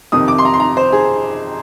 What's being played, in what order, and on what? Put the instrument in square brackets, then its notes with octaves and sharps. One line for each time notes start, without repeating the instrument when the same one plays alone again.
[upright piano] F2 C3 D#3 D#6
D6
C6
A#5
C6
A#5
C5
G#4